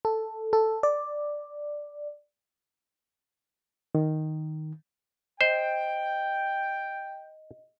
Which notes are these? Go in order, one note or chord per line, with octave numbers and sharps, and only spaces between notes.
A4
A4
D5
D#3
C5 D#5 G5